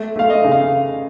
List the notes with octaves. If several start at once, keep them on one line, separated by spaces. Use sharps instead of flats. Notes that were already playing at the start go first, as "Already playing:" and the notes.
Already playing: A3
A3 F5
D#5
C#3
F5